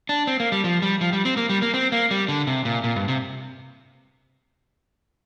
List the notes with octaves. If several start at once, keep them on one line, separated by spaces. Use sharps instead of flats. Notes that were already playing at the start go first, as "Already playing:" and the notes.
D4
C4
A#3
G3
F3
G3
F3
G3
C4
A#3
G3
A#3
C4
A#3
G3
D3
C3
A#2
A#2
G2
C3